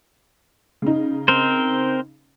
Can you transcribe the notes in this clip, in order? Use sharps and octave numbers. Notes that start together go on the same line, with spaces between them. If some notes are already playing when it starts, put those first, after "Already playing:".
C#3 D#4
C4 A#4 C5